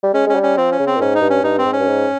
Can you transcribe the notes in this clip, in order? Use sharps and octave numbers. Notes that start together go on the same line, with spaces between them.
G3
G#3 C#4
G#3 C#4
G3
C#4
F3 C4
C#4
C#3
C4
A#2
G#2 C#4
D#4
G2
C#4
G2 D#4
C4
G#2
C#4
G2
G#2